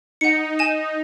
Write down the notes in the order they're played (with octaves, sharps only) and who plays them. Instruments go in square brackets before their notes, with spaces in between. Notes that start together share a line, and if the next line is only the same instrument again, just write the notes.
[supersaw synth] D#4 [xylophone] F#5 C#7
[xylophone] G#5 E7